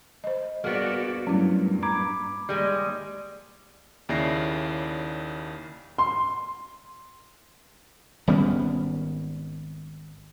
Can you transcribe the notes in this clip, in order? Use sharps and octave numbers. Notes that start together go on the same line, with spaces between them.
C5 D#5
G2 A#3 B3 F#4 G#4 D5
G2 A#2 F#3 G3 A3 C#4 E4
A#5 B5 D6 G#6
D#2 G3 G#3
D#2 C#3 E4 D5 A#6 C7
C6
G#1 G3 B3 C#4